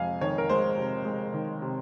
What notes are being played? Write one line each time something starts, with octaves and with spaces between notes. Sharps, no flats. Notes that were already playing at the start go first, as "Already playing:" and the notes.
Already playing: F2 C3 G#3 F5 G#5
D#3 C#5
A#4
G#3 C5
C3
G#3
D#3
C3